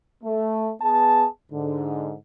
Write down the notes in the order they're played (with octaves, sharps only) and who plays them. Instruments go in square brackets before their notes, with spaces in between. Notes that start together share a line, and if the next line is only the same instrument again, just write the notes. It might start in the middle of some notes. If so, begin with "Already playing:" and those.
[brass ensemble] A3
B3 G#4 A5
G#2 D3